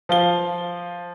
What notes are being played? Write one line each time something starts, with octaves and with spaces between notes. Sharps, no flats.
F3 F5 G7